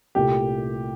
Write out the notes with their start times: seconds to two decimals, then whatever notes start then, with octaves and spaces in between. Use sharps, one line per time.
0.15 C2 A#2 A3 G4